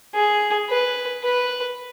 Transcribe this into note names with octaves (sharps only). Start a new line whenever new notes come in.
G#4
B4
B4